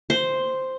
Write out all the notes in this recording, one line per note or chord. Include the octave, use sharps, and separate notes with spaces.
C5